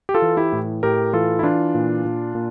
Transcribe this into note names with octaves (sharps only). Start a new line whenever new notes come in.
G4
F4 A4
E3
E4 G4
A2
A2 G4 A#4
E3 F4 A4
E4
E3 D4 F4
A#2
A#2
A#2